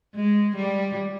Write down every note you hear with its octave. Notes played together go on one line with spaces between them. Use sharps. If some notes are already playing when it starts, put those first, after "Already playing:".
G#3
G3